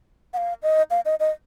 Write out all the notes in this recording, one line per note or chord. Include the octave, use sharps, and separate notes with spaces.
F#5
F5
D#5
F5
D#5
D#5